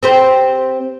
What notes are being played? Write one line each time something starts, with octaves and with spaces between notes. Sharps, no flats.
C4 G4 C5